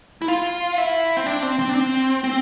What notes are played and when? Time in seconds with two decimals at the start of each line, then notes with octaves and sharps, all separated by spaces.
0.22 E4
0.28 F4
0.78 E4
1.17 C4
1.26 D4
1.42 C4
1.59 C4
1.69 D4
1.74 C4
2.24 C4